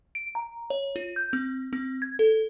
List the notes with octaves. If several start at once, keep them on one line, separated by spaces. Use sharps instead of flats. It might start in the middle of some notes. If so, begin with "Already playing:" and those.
D7
A#5
C#5
F4
G6
C4
C4
G#6
A4